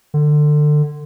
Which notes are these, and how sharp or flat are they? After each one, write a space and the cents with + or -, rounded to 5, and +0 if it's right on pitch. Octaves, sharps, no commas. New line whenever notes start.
D3 +25